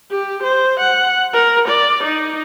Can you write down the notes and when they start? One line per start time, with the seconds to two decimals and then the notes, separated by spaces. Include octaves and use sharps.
0.11 G4
0.43 C5
0.80 F#5
1.34 A#4
1.68 D5
2.04 D#4